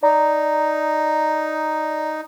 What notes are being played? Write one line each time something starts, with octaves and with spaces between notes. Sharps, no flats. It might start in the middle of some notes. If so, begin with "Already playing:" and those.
D#4 D5 A#5